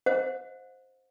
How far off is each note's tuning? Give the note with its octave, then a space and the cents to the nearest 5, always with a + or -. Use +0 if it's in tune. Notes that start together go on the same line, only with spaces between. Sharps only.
C5 +0 D#5 +15 F#5 -45